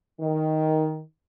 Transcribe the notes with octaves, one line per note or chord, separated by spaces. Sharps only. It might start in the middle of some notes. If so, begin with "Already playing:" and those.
D#3